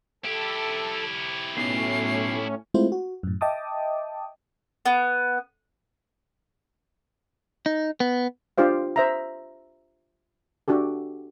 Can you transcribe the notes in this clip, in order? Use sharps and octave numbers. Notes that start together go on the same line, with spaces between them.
E4 G4 A4
B1 A2 C#4 C7
G#3 A3 C4 E4 F4 C5
F#4
F#2 A2
D#5 E5 G5 A5 D6 D#6
B3
D#4
B3
D4 F4 G4 C5 F5
C5 E5 A#5
D4 F#4 G4 A4